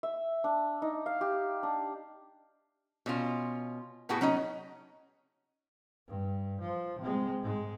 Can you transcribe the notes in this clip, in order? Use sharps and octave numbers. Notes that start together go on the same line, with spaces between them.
E5
D4
D#4
F5
G4
D4
B2 C#4 F4
A2 B3 E4 F#4 G#4
F#3 C#4 D#4 D#5
G2
F3
C3 G#3
G#2 G#3